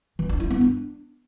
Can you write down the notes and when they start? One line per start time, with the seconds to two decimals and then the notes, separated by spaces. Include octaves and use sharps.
0.19 E3
0.29 D4
0.40 E4
0.50 B3
0.61 D4